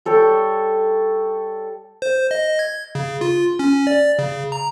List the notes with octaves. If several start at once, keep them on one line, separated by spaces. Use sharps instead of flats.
G3 A4 C#5 G5
C5
D#5
G#6
C#3
F4
C#4
D5
C#3
A#5